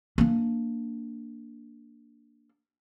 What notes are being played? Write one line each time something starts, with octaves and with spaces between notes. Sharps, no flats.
A#3 D4